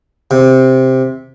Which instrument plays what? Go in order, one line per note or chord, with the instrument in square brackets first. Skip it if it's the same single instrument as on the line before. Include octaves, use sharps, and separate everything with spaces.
[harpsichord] C3